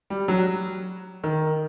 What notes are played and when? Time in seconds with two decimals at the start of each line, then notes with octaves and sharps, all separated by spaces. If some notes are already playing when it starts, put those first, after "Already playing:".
0.10 G3
0.28 F#3
1.24 D#3